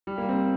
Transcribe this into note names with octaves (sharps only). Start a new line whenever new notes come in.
G3
A#3
C4